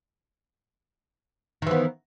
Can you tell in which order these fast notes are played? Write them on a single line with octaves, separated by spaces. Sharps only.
D#3 E3 B3